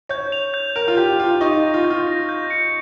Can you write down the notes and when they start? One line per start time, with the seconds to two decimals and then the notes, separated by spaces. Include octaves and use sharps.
0.09 C#5 G6
0.32 F7
0.54 G6
0.76 A#4 F7
0.88 F4
0.97 G4 G6
1.19 F4 F7
1.41 D#4 C#6
1.63 A#6
1.74 F4
1.84 G6
1.90 F4
2.07 A#6
2.29 G6
2.50 C#7